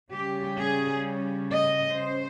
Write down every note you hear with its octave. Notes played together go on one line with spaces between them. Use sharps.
C#3 G3 C#4 G4
G#4
D#5
C#3 C5